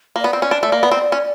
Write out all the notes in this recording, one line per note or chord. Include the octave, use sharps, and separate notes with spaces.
A#3
B3 D5
C4
C#4
D4
A3
A#3
B3
C4
C#4